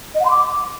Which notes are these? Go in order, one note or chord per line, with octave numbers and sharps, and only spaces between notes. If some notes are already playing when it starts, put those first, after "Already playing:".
D#5
F#5
C6
D6